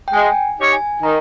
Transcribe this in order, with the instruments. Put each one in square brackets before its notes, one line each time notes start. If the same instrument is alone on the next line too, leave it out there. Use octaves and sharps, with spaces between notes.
[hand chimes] G5
[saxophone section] G#3 [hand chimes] G#5
[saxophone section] D#4 G4 C#5
[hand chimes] G#5
[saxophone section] D#3 [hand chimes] A#5